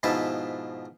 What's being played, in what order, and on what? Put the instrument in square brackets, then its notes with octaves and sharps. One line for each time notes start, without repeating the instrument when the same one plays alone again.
[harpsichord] G#2 B2 F3 E4 B4 A5